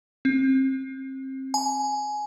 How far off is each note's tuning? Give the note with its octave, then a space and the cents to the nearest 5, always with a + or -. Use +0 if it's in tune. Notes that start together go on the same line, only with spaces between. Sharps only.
C4 +30
G#5 +15